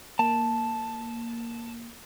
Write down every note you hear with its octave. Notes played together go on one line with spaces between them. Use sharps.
A#3 A5